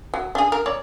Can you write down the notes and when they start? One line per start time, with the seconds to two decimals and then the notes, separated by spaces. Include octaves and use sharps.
0.14 F#3
0.35 D4 G#4
0.52 A#4
0.66 C#5 D5